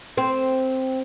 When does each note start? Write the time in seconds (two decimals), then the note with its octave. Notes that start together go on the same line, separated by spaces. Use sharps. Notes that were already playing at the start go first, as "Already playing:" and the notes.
0.17 C4